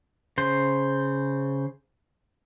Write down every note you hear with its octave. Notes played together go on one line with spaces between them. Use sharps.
C#3 C5